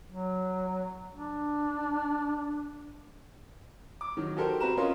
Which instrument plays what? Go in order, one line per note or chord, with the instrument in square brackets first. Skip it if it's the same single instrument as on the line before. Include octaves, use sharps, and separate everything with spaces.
[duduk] F#3
D4
[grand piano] D6
D#3 F#3
F#4 G4 A4 A#4 C5
C4 F#4 B4 A#5 E7
C#4 F4 A#4 D#5 C6